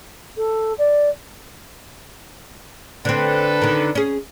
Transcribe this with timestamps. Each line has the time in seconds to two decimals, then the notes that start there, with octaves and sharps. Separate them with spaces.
0.37 A4
0.78 D5
3.05 D3 C4 A4 B4
3.62 D3 D#3
3.95 C#4 G#4